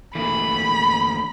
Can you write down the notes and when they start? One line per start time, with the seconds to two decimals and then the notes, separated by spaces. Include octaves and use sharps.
0.15 E3 A3 A#3 B5